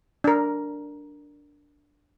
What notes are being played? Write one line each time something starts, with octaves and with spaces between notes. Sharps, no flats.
D4 A#4